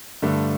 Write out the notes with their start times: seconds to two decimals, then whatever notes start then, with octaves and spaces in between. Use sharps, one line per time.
0.22 G2 D3 A3